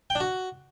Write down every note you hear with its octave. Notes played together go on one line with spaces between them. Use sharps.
G5
D4
F#4